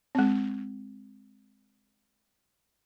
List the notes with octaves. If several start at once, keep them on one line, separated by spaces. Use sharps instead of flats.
G#3 C4